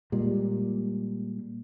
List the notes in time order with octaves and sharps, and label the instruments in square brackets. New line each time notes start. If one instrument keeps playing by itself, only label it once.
[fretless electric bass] A#2 G3 G#3